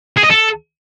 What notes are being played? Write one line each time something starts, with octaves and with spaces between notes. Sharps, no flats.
G#4
D#5
A4